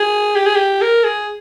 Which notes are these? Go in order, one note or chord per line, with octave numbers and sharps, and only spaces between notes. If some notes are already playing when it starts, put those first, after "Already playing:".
Already playing: G#4
G4
G#4
G4
A#4
G#4